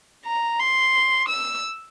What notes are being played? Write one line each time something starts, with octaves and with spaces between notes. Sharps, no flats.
A#5
C6
E6